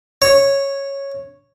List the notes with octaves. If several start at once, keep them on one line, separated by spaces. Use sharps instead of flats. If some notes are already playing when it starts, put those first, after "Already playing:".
C#5